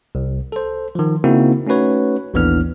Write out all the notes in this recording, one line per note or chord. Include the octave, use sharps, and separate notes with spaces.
C2
A4 C5
D#3 F3
C#3 A#3 C4 D#4 E4 F#4
A3 C#4 D#4 F#4 B4 C#5
A1 D#2 E3 B3 D4 F6